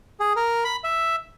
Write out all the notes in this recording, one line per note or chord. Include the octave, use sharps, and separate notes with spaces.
G#4
A#4
B5
E5